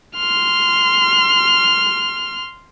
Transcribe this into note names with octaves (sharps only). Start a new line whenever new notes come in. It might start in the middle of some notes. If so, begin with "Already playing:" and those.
C6 F6